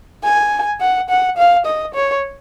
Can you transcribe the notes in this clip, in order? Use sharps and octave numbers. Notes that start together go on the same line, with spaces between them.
G#5
F#5
F#5
F5
D#5
C#5